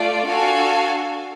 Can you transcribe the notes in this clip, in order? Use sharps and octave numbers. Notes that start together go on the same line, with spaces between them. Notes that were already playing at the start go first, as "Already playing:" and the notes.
Already playing: A3 F4 D5
D4 F#4 A4 F5 G#5